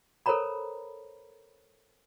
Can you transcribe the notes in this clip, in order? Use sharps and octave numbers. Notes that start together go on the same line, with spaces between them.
A4 A#4 C5 C#5 A#5 B5